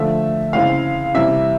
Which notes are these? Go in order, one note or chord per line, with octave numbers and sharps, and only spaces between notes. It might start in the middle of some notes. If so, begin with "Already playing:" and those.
Already playing: D3 F3 A3 E5
C#3 E3 G#3 C4 E4 F5
C3 E3 G3 E5